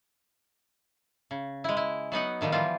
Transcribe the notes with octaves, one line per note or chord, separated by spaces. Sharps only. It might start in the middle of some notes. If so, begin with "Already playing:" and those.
C#3
G#3 E4
E4
F#3 B3 D#4 F#5
A2 D#3 F3 G3
E3 F3 G3 F4